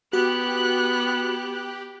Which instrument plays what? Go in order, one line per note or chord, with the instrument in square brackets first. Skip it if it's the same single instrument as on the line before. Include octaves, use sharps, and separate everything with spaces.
[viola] B3 [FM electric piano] F#4 [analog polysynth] G4 [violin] F#6